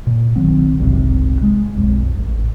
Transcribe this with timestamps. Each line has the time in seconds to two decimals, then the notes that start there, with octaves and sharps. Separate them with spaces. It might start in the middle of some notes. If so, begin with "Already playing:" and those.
0.07 A#2
0.36 B1 D#3 F#3 C4
0.79 F#1 C2 G#2 C3
1.42 G#3
1.77 B1 F2
2.19 A1